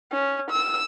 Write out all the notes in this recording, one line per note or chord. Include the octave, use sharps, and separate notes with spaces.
C#4
E6